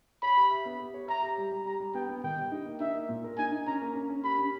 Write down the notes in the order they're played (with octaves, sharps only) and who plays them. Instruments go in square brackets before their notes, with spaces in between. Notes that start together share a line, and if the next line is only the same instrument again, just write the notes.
[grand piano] C#5 [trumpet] B5
[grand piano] G4
E5
B3
G4
C#5
[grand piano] E5 [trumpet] A#5
[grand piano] G4
G3
G3
[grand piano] G3 [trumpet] A#5
[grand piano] G3
[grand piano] B3 [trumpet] G5
[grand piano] B3
[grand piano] D#3 [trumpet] G5
[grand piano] G3
D#4
A#3
[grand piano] D#4 [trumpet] E5
[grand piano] A#3
A#2
A#4
[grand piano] D#4 [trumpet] G#5
[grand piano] D#4
[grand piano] C#4 [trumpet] A#5
[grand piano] A#3
C#4
C#4
[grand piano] G4 [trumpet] B5
[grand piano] C#4